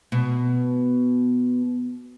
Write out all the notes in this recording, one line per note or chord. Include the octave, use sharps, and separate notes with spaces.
B2